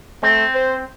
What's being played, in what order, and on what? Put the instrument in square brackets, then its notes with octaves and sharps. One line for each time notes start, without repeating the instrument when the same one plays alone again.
[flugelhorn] A3 [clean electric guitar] C4
[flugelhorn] C5